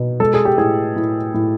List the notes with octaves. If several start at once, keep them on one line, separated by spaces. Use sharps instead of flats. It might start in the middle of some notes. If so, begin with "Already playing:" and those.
Already playing: B2
G#3 A4
G#4
G4
A2 G#4
A2
A2